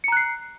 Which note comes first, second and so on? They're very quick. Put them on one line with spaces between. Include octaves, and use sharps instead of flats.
C#7 A#5 F#6 C7